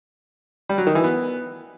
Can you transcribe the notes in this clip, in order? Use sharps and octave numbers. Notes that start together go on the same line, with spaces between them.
G3
F#3
D#3
E3
B3